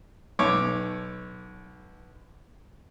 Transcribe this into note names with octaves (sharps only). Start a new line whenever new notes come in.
B1 C#5 D6